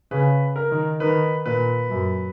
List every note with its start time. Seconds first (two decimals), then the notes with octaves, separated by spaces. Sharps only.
0.11 C#3 B4
0.56 A#4
0.71 D#3
1.00 D#3 B4
1.46 A#2 B4
1.90 F#2